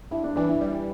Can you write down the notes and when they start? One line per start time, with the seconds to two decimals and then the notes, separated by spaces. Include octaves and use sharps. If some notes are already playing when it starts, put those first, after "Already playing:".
0.11 G2 E4
0.24 D4
0.36 E3 D4
0.48 E4
0.61 G3